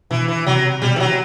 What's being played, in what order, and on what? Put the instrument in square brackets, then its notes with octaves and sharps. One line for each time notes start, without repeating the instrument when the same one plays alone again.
[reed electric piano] B2 [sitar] E3
[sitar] E3
[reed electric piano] C3 [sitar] F#3
[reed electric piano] B2 [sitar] G3
[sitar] E3
F#3